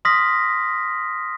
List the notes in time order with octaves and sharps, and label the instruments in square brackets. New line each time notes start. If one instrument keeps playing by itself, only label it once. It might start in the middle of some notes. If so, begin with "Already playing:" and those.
[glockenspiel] C6 D#6 F6 A#6 B6